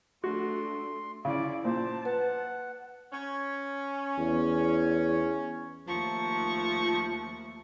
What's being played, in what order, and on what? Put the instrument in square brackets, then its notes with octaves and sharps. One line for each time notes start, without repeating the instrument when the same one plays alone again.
[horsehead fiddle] A3 D4 [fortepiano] F#4 [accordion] C6
[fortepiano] C#3 [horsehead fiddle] E4 D5
[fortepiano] A#2 [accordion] C5 [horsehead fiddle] A5
[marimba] B4 [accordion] F#5
[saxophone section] C#4
[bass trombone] E2
[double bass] D#2 A3 [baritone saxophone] F3 [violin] C#6